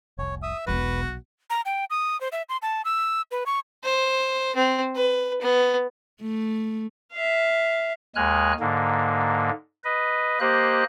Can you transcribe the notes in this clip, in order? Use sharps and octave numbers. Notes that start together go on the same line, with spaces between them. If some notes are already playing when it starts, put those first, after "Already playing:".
F1 C2 C#5
E5 D#6
E1 B1 D4 F#4 B4
A#5
G5
D#6
C5
E5
C6
A5
E6
B4
C#6
C5
C4
B4
B3
A3
E5 F5
D#2 G#3 G#5 F6 F#6
G#2 D3 A#3
B4 D#5
A#3 G4 C5 D#5 F#6